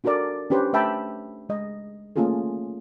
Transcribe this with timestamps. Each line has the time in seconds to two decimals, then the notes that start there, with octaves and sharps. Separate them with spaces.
0.04 D4 F#4 A4 A#4 D5
0.50 C#4 D4 G4 B4 C5
0.73 A3 B4 E5 G5 A5 B5
1.49 G#3 D#5
2.16 A3 A#3 C#4 F4 G#4 A4